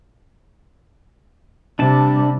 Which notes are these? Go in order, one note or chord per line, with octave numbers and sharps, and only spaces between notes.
C3 G3 D4 A5